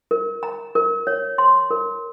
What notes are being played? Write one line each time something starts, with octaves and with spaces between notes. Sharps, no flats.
A#4
A#5
A#4
C#5
C6
A#4